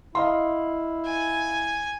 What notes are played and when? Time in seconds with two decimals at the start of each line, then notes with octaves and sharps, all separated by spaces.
0.15 E4 D#5 F5 C6
1.05 G#5